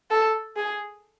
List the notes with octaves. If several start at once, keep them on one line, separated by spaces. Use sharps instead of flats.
A4
G#4